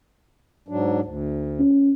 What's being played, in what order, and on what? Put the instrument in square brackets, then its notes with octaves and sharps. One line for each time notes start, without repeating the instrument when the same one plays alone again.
[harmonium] G#2 F#3 D4
D2
[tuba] C#4